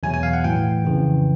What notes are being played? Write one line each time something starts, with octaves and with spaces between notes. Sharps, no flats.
E2 B2 F#3 G#5
G#5
F5
F#5
A2 E3 G5
F2 C#3 E3